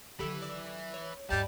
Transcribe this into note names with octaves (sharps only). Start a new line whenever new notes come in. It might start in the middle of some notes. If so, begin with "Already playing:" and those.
D3 D#3 F#3 G4 A4 B4 E5
D5 D6 E6
C#5
D2 G2 G3 D5 D#5 A5 B5